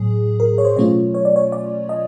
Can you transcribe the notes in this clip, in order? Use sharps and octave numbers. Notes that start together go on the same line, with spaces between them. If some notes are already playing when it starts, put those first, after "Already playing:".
Already playing: A2 F#3 G#4
A#4
C#5
C5
B2 F#3 A3 C#4 F4 C#5
C#5
D5
C#5
D5
D#5